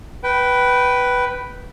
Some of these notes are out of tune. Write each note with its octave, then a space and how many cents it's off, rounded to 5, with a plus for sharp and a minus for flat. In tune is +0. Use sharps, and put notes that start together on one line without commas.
B4 +0 G5 -25